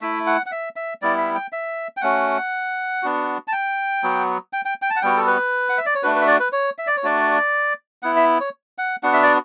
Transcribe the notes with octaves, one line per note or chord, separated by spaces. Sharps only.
A3 E4 E5
F#5
F#5
E5
E5
G3 B3 E4 D5
E5
G5
E5
G5
A3 C#4 F#4 F#5
B3 D4 F#4
A5
G5
F#3 B3 F#4
G5
G5
G5
A5
F#5
G3 B3 F#4 G5
A4
B4
F#5
E5
D5
C#5
A3 D4 F#4 B4
B4
E5
D5
B4
C#5
E5
D5
C#5
A3 D4 F#4 D5
B3 E4 F#5
E5
C#5
F#5
B3 D4 F#4 F#5
E5
D5